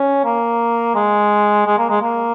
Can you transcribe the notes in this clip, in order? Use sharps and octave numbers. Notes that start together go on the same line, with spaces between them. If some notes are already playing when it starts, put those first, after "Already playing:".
Already playing: C#4
A#3
G#3
G#3
A#3
G#3
A#3